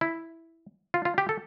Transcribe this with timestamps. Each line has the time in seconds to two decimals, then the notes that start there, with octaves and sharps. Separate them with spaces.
0.01 E4
0.94 F4
1.05 F4
1.18 G4
1.29 A4